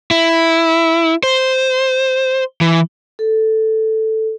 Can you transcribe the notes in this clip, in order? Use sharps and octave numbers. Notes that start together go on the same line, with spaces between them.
E4
C5
E3
A4